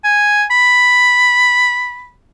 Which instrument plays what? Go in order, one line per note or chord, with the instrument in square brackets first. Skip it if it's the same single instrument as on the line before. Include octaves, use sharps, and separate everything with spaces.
[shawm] G#5
B5